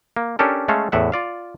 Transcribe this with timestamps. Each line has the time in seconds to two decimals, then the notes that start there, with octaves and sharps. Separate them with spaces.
0.17 A#3
0.39 C#4 D4 G4 A4 A#4
0.68 G#3 A3 C#4 A4 F5
0.92 E2 A2 E5 F#5
1.12 F4 D5 F5